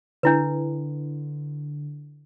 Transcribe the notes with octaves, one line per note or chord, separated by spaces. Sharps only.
D3 D4 E4 B4